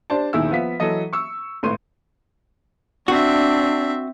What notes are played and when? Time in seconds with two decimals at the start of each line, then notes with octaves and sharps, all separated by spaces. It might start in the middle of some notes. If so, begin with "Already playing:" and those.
0.10 D4 G4 C5 D5 A5
0.33 D#1 B1 D#3 E4 G#4 E6
0.50 F3 B3 F4 E5 B6
0.80 E3 F#3 A4 D#5
1.13 C#6 E6 C#7
1.63 G#1 A2 B4 C6 D#7
3.08 C4 D4 F#4 E5